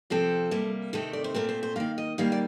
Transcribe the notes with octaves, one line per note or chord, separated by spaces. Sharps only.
C3 F3 C4 A4
C3 G3 A#3
C3 D#3 A3 C4 A4
D5
C5
A#2 A3 C4 A#4
C5
C5
D#3 A#3 F5
D#5
D#3 G3 A#3 F5
D5